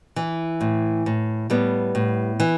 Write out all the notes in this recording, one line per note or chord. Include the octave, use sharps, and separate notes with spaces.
E3
A2
A2
A2 G3 B3
A2
E3